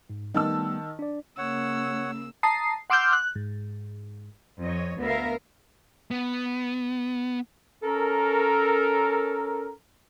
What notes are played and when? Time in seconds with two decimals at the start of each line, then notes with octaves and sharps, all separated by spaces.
0.10 G#2
0.34 D#3 G3 A3 B3 A5 E6
0.99 D4 D5
1.38 C#3 A#3 C#5 F#5 E6
2.43 A5 A#5 D#6 C7
2.90 F#5 C6 D6 E6 F6 G6
3.13 F#6
3.35 G#2
4.63 F2 C#5 D#5
5.00 D2 B3 A#4 E5 F5
6.11 B3
7.83 C#4 A4 A#4